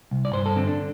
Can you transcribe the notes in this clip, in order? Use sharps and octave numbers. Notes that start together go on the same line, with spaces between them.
C2
D5
G2 C5
A4
D3 C4
D4